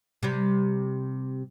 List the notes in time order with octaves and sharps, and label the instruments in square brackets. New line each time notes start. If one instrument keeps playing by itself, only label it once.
[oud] C3 G3